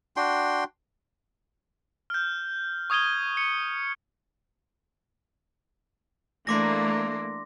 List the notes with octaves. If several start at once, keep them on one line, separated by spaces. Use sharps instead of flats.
D4 F#4 G5 C6
F6 G6
C#6 D#6 G#6 D#7 G7
C#7
E3 A3 A#3 D4 C6 D6 A#6